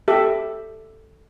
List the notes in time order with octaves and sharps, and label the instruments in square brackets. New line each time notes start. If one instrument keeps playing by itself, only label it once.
[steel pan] G4 A4 E5